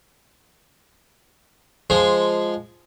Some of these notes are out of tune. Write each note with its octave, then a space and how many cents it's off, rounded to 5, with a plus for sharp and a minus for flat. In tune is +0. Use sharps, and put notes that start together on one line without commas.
F3 -5 G#3 +0